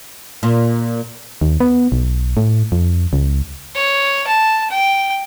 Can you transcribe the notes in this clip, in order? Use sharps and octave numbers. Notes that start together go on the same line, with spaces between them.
A#2
D#2
B3
B1
A2
F2
C#2
C#5
A5
G5